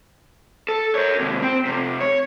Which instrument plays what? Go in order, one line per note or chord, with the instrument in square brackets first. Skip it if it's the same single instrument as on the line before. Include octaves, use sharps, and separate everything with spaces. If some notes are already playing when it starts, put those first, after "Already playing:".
[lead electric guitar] A4
A#4 C#5
D#2 C3
C4 G5
F2 C3
C#5